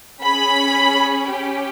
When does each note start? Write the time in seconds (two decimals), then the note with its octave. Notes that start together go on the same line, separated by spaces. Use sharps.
0.23 C#4 G#4 B5
1.31 C#4 G4